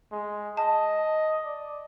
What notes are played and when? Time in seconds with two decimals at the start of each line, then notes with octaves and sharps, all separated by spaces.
0.11 G#3
0.57 D#5 A5
1.45 D5